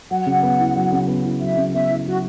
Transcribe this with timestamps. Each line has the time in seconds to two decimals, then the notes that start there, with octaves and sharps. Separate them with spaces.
0.10 F#3 F#5
0.27 C#3
0.43 B3
0.60 E4
0.76 F#3
0.92 C#3
1.08 B3
1.24 E4
1.41 F#3 E5
1.57 C#3
1.73 B3 E5
1.90 E4
2.06 F#3 F#4